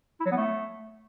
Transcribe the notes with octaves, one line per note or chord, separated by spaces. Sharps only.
E4
F#3
B3
A3